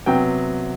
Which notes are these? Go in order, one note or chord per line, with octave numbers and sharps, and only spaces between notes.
C3 F#3 B3 G5